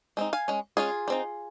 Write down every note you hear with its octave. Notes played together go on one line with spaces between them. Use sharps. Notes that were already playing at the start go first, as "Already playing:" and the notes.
G#3 C4 D#4
F5 G#5
G#3 C#4
G#3 C#4 F4 G#4
G3 C4 D#4